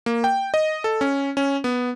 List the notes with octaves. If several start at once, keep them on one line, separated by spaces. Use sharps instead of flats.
A#3
G5
D#5
A4
C#4
C#4
B3